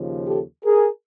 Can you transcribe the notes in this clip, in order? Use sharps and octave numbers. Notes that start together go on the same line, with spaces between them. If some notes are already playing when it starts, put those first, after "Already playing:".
Already playing: D#2 C#3 F3
G4 A4
G#4 A#4